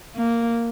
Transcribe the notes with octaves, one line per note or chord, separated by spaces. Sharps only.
A#3